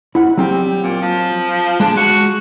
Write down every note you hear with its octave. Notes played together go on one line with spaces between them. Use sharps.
E4 F#5
F#3 G3 C4 G5
A#2
F3
G#3 D4
F#4